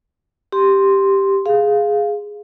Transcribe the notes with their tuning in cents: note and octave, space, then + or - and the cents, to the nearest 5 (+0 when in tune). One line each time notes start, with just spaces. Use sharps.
G4 +0 C6 +0
G#4 +0 F5 +0